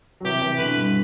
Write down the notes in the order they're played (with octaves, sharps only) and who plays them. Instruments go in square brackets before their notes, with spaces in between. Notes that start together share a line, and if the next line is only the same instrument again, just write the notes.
[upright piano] F#3
[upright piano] C3 E3 [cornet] G4
[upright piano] C3 E3
[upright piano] B2 D3 [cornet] B4
[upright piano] G2